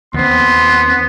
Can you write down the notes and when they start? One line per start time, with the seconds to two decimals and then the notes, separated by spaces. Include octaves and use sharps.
0.14 D#2 B3 C4 C6